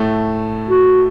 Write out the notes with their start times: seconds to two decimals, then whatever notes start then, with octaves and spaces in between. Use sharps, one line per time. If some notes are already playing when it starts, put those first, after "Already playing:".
Already playing: A2 A3
0.68 F#4